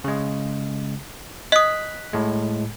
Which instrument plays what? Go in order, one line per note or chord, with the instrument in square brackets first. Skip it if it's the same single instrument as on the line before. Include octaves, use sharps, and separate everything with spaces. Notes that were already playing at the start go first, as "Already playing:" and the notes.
[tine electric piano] C#3 G#3
[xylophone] D#5 D#6 [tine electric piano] F#6 B6
[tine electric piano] A2 G#3